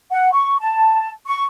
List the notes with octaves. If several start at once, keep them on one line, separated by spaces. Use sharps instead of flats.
F#5
C#6
A5
C#6